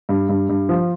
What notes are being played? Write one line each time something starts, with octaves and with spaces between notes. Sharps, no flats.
G2
G2
G2
F3